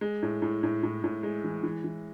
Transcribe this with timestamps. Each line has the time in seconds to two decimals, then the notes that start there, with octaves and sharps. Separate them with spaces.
0.01 G#3
0.23 A2
0.42 A2
0.63 A2
0.83 A2
1.04 A2
1.23 G#3
1.44 E3
1.63 E3
1.84 E3